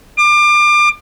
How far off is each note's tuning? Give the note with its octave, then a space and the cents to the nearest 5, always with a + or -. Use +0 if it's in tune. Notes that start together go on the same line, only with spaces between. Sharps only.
D6 +30